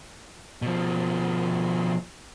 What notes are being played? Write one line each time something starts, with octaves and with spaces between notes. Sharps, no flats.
B2 F3